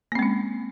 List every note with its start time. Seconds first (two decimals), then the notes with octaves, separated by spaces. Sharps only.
0.12 A#3
0.15 C4
0.19 G#3
0.23 C#4